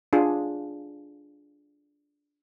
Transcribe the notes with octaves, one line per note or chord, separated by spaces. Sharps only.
D4 F4 G#4